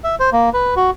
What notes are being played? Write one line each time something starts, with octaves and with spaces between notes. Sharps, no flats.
E5
C5
A#3
B4
F#4